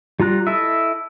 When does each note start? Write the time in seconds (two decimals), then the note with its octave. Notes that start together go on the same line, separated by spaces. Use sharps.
0.20 G3 F4 A#5 F#6
0.47 E4 A4 D#5 E5